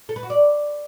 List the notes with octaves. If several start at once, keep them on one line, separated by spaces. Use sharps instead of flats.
A4
B4
F#4
D5